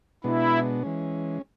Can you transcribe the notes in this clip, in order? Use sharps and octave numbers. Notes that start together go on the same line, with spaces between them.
B2 G#3 B3 D4 E4
E3 G#3 C#4